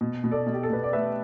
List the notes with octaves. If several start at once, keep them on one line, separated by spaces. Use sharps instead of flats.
B2
B2
A4 D5
B2
G4
A4
B2 B4
D5
A3 B4 E5